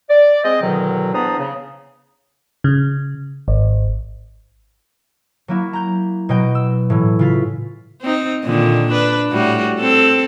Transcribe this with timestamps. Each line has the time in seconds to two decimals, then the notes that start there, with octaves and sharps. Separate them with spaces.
0.09 D5
0.44 G#3 C4 C5 D#5
0.61 E2 B2 D3 D#3 F#3
1.13 E2 B3 D4 C5 A#5 D#6
1.38 C#3
2.64 C#3
3.48 G#1
5.48 F#3 A#3 E4
5.73 A#5 G6
6.29 B2 F#3 D#5 G5 G6
6.55 E6
6.90 A2 E3
7.19 C#3 F4 B6
8.01 C4 D#4
8.44 A#2 D3 D#3
8.91 D4 B4
9.31 A2 G3 F#4
9.80 C4 A4